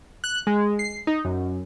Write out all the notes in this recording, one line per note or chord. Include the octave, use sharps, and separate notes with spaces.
F#6
G#3
C7
D#4
F#2